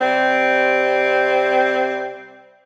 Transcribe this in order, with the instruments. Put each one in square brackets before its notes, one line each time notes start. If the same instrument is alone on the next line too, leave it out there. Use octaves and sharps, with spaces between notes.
[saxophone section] C3 G3 C4